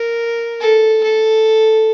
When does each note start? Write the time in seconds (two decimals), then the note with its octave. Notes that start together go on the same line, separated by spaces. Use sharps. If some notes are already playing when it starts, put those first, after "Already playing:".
Already playing: A#4
0.60 A4
1.04 A4